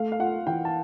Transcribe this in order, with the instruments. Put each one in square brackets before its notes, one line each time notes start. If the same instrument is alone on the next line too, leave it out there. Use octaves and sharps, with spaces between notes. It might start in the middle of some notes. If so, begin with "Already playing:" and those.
Already playing: [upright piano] A3 [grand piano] F5
[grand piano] F5
[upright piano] F4 [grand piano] F#5
[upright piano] E3 [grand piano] G5
[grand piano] A5